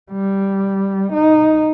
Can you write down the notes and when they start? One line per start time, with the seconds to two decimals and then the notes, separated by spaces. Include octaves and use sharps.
0.12 G3
1.13 D#4